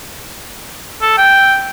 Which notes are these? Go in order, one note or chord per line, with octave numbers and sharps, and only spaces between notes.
A4
G5